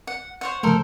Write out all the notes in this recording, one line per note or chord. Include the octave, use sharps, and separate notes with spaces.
F#5
C5 C#5 F#5
C#3 F3 A3 A4 A#4 C5